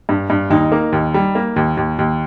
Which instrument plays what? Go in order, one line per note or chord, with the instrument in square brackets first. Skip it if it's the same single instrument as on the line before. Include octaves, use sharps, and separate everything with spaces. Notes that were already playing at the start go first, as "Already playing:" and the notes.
[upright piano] G2
G2
D#2 D#4
A#3
D#2
G3
A#3
D#2
D#2
D#2